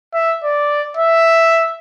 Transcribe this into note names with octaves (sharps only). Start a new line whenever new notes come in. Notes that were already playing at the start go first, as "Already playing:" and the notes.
E5
D5
E5